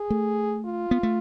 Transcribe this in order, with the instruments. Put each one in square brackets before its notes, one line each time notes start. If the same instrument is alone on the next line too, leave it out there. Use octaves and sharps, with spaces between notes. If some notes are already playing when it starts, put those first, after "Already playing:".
Already playing: [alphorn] G#4
[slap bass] A3
[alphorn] F4
[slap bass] B3
A3